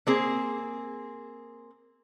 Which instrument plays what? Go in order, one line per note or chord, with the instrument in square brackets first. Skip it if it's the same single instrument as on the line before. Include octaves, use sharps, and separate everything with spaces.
[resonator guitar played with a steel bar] A#3 C4 G#4